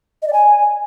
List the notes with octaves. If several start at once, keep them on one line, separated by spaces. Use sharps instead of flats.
D#5
D5
G#5